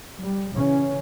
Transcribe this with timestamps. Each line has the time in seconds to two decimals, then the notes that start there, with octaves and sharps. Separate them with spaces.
0.20 G3
0.54 C#3 E3 C#4